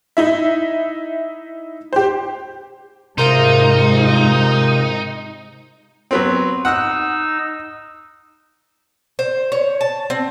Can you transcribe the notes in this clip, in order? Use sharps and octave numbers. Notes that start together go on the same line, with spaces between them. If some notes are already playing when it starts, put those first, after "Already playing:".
D#4 E4 E5
G4 C5
G#2 C3 D#4 F4 A#4 C5
F#3 B3 C4
D#4 F#5 E6 F#6
C5
C#5
A5
C4